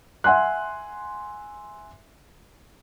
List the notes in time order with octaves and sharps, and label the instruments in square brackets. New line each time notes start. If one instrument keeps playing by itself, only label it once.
[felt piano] E5 F#5 G#5 C6 F#6